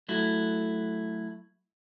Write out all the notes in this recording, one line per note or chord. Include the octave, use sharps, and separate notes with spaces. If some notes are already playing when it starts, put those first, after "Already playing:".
F#3 A3 E4